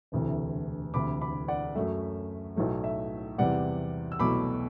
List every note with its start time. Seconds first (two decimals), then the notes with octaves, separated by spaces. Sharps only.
0.12 E1 D2 C3 E3 A3
0.94 E1 D2 C3 B5 D6
1.21 B5 D6
1.48 D5 F#5
1.75 F#2 F#3 A3 E5
2.56 B1 A2 F#3 A3
2.84 E5
3.38 E2 C3 G3 D5 F#5
4.12 E6
4.20 C2 B2 F#3 A3 B5 D6